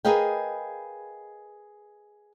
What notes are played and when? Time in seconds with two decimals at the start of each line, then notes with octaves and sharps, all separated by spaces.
0.05 G#4 A#4 B4 D#5 F5 G5